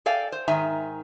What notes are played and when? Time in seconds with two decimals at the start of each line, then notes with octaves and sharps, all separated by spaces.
0.06 A4 D5 F5 G5 G#5
0.32 C5
0.48 G#2 D#3 E5 G#5 A#5